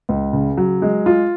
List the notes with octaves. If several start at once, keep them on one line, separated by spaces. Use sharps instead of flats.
C#2
C#3
F#3
G#3
F4